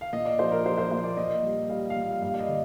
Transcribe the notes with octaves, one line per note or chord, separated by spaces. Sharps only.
F5
A#2 D#5
D5
F3 C5
A#4
F3 C5
C5
A#2 C5
D5
A#2 D#5
G3
G3 F5
F5
A#2
F5
G2 F5
D5
D#5
D3